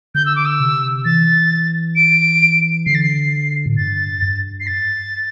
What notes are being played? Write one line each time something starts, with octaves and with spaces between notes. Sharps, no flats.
D3 G6
E6
D6
E6
C3
E3 A6
D7
D3 C7
A6
C7
A2
G2 A6
G2
C7
A6